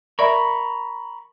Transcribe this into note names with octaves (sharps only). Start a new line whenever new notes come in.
A#4 D5 E5 A#5 B5 C#6